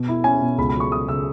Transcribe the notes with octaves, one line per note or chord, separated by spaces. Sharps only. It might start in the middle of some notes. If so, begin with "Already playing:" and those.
Already playing: B2
E4
C#4 G#5
B2
C#2 B5
B5
F#3
C#6
C#3 D#6
C#3 E6